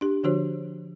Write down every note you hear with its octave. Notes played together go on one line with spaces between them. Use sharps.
D4 G4
D3 F3 D4 F#4 C5 C#5